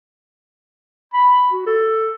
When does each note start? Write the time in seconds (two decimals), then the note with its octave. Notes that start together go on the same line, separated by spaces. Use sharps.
1.14 B5
1.52 F#4
1.67 A4